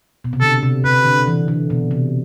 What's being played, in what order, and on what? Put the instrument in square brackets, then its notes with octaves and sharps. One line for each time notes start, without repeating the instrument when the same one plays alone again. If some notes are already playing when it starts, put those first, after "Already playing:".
[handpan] B2
C3
[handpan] D3 [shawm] A4
[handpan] C3
[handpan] C3 [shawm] B4
[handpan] D3
E3
D3
B2
C3